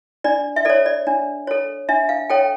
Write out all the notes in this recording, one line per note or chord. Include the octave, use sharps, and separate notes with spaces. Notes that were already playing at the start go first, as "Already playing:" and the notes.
D4 D5
E5
A4 C#5 D5
D5
D4
A4 C#5
D4 E5
F5
A4 C#5 G5